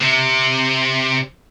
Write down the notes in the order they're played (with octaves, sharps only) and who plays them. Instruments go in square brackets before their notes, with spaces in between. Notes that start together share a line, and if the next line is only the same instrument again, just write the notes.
[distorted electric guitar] C3